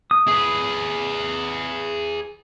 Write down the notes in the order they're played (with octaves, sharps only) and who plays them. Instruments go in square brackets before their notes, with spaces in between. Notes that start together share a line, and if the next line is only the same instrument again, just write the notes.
[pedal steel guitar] D#6
[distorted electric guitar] G#4 B4